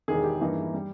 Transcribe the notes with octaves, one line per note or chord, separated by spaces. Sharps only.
E1 E2 D#3 G#4
G4
G2 E3 A#3 D#4
G3